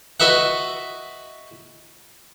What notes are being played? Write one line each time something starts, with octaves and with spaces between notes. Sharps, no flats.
F#4 B4 D#5 E5 F#5